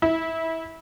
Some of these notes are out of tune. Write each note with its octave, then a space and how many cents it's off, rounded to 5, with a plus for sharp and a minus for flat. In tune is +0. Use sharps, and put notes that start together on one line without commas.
E4 -25